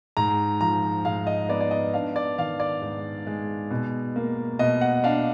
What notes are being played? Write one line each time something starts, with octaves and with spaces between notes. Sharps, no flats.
G#2 A#5
F3 A#5
G#2 F5
D#5
B3 D5
D5
D#5
D4 F5
D5
D#3 F5
D5
G#2
G#3
B2
A#3
B2 D#5
F#5
D4 F5